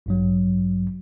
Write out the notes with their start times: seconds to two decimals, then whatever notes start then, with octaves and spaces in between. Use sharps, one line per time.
0.06 A1 G2 F#3